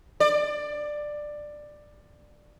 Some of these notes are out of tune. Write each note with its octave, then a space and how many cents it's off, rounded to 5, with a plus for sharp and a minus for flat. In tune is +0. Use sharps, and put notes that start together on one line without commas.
D5 +15